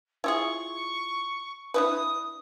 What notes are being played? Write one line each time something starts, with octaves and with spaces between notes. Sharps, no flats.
E4 F4 G#4 C#6
D4 E4 B4 D#6